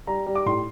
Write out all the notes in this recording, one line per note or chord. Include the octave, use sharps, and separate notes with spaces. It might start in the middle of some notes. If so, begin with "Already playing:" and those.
G3 A#5
G3
D6
A2 C6